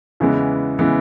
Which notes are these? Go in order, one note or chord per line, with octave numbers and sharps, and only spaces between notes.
E2 C#3 E3 G#3 B3
C#3 E3 G#3 B3